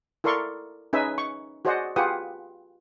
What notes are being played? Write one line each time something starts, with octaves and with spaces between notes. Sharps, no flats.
E4 A4 A#4 D5 C6 C#6
C#4 D#4 G#4 B4 E5 G#5
C#6
F#4 G#4 C5 D5 D#5 F#5
F4 G4 G#4 B4 F#5 D#6